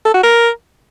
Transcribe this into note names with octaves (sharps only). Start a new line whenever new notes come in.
A4
F#4
A#4